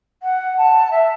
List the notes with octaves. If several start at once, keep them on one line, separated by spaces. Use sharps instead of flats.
F#5
A5
E5